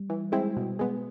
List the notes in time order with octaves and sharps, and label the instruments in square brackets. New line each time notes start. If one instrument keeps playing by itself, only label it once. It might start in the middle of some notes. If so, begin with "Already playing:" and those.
Already playing: [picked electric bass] G3
[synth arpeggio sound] E3
G#3 C4 E4
B2
G#3 B3